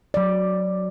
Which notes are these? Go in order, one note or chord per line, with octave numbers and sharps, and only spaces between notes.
F#3 D5